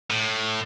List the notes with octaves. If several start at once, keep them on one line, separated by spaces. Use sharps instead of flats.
A2